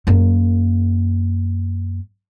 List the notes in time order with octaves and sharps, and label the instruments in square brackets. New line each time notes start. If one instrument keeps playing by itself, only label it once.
[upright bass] F#2 A#3